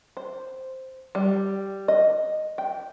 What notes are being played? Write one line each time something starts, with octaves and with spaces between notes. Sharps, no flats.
C5
G3
D#5
G5